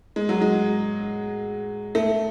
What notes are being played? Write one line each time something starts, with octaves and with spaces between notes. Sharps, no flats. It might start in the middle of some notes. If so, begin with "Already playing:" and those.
G#3
F#3
G#3
A3